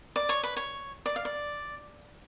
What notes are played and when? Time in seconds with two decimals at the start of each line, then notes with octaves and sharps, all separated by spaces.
0.16 D5
0.29 C#5
0.43 B4
0.57 C#5
1.06 D5
1.16 F5
1.25 D5